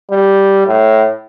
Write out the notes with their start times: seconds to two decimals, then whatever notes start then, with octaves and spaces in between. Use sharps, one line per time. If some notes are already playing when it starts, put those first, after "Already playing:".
0.10 G3
0.67 A2